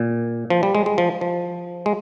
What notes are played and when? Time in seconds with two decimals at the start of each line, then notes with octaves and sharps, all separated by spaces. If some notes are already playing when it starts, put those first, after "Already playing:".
Already playing: A#2
0.50 F3
0.63 G3
0.75 G#3
0.86 G#3
0.98 F3
1.21 F3
1.86 G#3